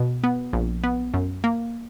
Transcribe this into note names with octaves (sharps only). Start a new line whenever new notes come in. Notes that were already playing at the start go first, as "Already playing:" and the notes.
Already playing: B2
B3
A#1
B3
F#2
A#3